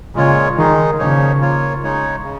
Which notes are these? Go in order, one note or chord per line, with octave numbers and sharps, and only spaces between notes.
A#2 C#3 G#3 F4 C#5
D#3 G#3 D#4 G#4
A#2 C#3 F3 A#3 D#4 C#5
A#3 F4 C#5
C#3 G#3 D#4 C#5
C#3